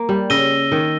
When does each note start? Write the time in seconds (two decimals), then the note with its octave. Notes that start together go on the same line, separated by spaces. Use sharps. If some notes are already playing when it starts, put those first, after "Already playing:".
Already playing: A#3
0.09 G3
0.30 C#3 E6 A#6 D#7 G7
0.72 D#3